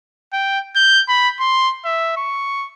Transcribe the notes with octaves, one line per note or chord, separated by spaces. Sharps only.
G5
G6
B5
C6
E5
C#6